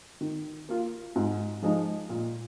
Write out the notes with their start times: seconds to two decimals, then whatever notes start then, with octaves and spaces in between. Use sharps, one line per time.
0.21 D#3
0.69 A#3 F4
1.16 G#2
1.62 F3 G#3 D#4
2.09 A#2